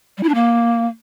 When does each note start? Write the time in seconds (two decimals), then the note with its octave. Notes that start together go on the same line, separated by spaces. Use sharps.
0.18 G3
0.23 E4
0.29 D4
0.34 A#3